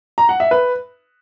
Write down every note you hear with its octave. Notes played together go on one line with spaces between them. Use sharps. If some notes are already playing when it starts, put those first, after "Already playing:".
A#5
F#5
E5
B4